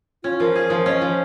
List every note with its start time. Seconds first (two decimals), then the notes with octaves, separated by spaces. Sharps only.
0.24 C#4 F4
0.40 F3 A#4
0.56 G#4
0.70 F3
0.86 C#4 D#5
1.02 F3